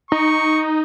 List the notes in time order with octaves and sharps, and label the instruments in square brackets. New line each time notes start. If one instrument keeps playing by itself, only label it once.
[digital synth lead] D#4 [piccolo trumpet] C#6